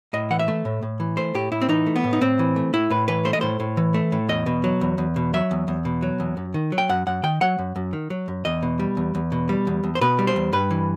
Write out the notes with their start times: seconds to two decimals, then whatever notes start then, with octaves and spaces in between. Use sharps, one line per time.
0.13 A2 D#5
0.30 E3 F#5
0.39 E5
0.48 A3
0.65 A2
0.83 A2
1.00 E3
1.17 A3 C5
1.34 A2 G4
1.52 A2 E4
1.61 C4
1.69 E3 D#4
1.86 A3
1.96 B3
2.04 A2
2.13 D#4
2.21 A2 C4
2.39 E3
2.56 A3
2.73 A2 E4
2.90 A2 B4
3.08 E3 B4
3.25 A3 C5
3.33 D#5
3.41 A2 C5
3.60 A2
3.77 E3
3.94 A3
4.12 A2
4.29 E2 D#5
4.46 B2
4.64 F#3
4.81 E2
4.98 E2
5.16 B2
5.34 F#3 E5
5.51 E2
5.68 E2
5.85 B2
6.02 F#3
6.20 E2
6.37 F#2
6.54 D#3
6.72 F#3
6.78 G5
6.89 F#2 F#5
7.07 F#2 F#5
7.23 D#3 G5
7.41 F#3 F#5
7.59 F#2
7.76 F#2
7.93 D#3
8.10 F#3
8.28 F#2
8.45 E2 D#5
8.63 B2
8.79 G3
8.97 E2
9.15 E2
9.32 B2
9.49 G3
9.67 E2
9.84 E2
9.95 C5
10.01 B2 B4
10.19 G3
10.27 C5
10.36 E2
10.53 G2 B4
10.71 E3